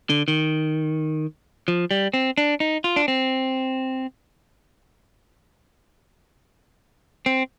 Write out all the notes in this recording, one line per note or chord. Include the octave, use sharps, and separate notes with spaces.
D3
D#3
F3
G3
C4
D4
D#4
F4
D4
C4
C4